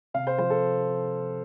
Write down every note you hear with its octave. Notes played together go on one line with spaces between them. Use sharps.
C3 F5
C5
F3 C5
A4